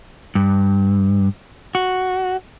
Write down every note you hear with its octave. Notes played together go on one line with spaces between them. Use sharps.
G2
F#4